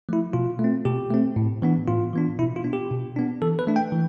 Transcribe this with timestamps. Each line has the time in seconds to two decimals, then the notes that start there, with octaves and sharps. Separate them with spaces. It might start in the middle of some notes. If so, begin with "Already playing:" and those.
0.09 F3 A3 E4
0.33 B2 F4
0.59 A3 C4
0.85 B2 G4
1.11 A3 C4
1.36 A2
1.62 E3 B3 D4
1.87 A2 F4
2.13 E3 B3 D4
2.39 B2 E4
2.56 F4
2.64 B3 D4
2.73 G4
2.91 B2
3.16 B3 D4
3.42 E3 A4
3.59 B4
3.67 A3 D4
3.76 G5
3.92 E3